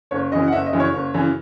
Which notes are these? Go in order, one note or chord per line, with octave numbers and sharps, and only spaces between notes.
F#1 C#5
F#2 C#3 E3 D#5
F#5
F#1 E5
D#5
F#2 C#3 E3
C#5
F#1
F#2 C#3 E3